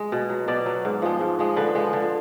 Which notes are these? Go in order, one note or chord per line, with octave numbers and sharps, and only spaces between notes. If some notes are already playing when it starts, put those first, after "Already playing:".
Already playing: G#3
B2
F#3
B2 D5
F#3
G#2
F3 G#3
G#2
F3 G#3
D3 B4
F3 G#3
D3